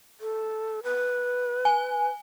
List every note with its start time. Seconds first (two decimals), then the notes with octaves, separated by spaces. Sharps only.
0.21 A4
0.83 B4
1.65 G#5